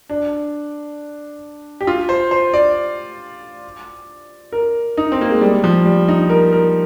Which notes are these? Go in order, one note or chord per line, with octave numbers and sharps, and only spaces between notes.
D4
G4
F4
C5
C5
D5
A#4
D#4
C4
A#3
G#3
G3
F3
G3
D#4
A#4
A#4